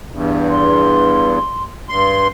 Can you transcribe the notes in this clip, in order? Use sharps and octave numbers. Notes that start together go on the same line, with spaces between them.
E2 G2
C6
G2 C6